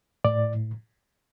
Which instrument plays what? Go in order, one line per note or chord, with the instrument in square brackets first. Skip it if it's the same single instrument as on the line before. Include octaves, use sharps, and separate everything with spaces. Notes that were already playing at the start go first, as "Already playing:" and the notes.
[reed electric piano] A2 D5